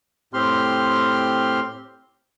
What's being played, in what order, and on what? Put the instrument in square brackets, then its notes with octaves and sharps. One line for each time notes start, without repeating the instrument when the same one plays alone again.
[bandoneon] A2 C4 G4 C6 F6